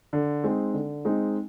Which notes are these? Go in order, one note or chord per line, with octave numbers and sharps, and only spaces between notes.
D3
G#3 C4 D#4
D3
G#3 C4 D#4